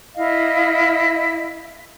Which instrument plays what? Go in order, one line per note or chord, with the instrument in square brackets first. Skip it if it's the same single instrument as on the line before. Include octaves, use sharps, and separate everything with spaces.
[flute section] E4 D#5 F5